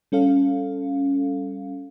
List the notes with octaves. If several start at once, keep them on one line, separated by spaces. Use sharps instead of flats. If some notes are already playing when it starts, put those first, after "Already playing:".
G3 C#4 A4 F5